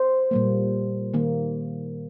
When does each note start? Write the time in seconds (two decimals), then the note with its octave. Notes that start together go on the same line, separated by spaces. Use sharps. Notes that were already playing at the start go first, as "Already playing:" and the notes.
Already playing: C5
0.31 A#2 G3 A#3
1.14 D#3 A#3